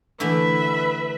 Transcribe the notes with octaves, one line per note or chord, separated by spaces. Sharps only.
D3 E3 A3 B4 E5